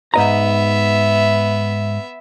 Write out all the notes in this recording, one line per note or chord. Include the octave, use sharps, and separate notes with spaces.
G#2 B3 D#5 E5 A#5